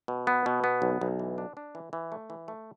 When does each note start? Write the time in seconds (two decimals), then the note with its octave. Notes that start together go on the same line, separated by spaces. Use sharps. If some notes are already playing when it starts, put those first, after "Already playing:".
0.08 B2
0.27 B3
0.46 B2
0.64 B3
0.82 B1
1.01 B1
1.19 E3
1.38 D4
1.57 D4
1.75 E3
1.93 E3
2.12 A3
2.30 E3
2.48 A3